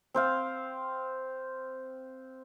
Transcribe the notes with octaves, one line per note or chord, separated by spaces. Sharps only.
C4 C5 F5